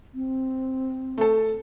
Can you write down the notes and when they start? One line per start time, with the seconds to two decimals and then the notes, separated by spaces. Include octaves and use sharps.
0.14 C4
1.18 A3 A4